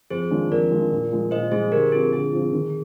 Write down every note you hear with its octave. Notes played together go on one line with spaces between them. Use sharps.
F2 G#4 C5
D#3 G#3 D4 F4
F2 A#4 D5
D#3 G#3 D4 F4
A#2
F3 G#3
A#2 C5 D#5
F3 G#3 G#4 C5
D3 G4 A#4
F3 C4 G#4
D3 G#4
F3 C4
D#3